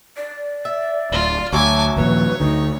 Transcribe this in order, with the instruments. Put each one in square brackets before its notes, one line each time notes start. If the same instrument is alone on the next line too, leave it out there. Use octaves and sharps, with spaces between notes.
[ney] D5
[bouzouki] E5
[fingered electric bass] D1 [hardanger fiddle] F4
[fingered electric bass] D2 [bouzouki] F#3 F#4 E5 [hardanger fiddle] G#5 D6 [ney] A5
[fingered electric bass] D#2 A#2 F3 [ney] B4 [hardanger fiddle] C#5
[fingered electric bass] D2 D3 [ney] D#4